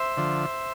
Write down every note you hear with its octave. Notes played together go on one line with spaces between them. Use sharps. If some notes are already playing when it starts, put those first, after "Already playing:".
Already playing: C5 E5
D3 F3